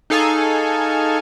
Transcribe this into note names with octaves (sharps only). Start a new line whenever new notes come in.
D#4 G#4 A4 F5 G#5 C#6